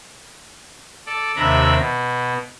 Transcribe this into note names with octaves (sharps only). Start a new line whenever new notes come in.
A4 D5
D#2 C3 D4 E5 A#5 B5
B2